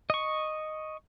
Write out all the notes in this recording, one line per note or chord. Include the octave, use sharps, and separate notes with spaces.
D#5 C#6